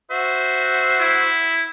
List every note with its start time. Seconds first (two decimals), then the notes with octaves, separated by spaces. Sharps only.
0.11 F#4 C5 E5
1.00 E4